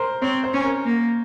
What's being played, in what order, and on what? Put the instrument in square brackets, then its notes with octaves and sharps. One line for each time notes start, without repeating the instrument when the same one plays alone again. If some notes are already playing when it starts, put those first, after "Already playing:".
Already playing: [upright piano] A#4 C5
[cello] C4 [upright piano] C#5
[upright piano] C5
[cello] C#4
[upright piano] A#4
[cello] A#3